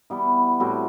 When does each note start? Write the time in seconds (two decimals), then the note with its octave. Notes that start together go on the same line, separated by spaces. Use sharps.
0.10 E3 G3 B3
0.60 A2 G3 C4 F#4